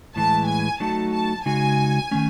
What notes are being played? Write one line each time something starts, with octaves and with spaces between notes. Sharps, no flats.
A2 E3 G#3 A5
G#5
F#3 A3 D#4 F#4 A5
A5
C#3 G#3 D#4 F#4 G#5
D#3 A3 C#4